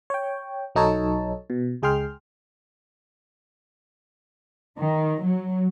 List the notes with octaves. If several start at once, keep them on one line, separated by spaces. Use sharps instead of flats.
C#5 G5
B1 F#3 D#4 A4 C#5 A5
B2
C#2 G#3 G#4 G5 C6 F6
D#3
F#3